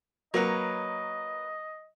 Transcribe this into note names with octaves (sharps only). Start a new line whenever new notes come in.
F#3 A#3 A#4 B4 C#5 D#5